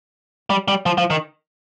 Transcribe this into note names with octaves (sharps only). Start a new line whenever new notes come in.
G3
G3
F3
F3
D#3